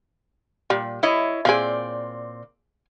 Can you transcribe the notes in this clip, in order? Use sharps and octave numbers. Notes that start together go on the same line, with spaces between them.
A#2 G3
E4 C#5 D#5
A#2 C4 G#4 D5 F5